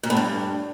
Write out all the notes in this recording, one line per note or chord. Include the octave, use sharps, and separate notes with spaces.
A#2
A2
G2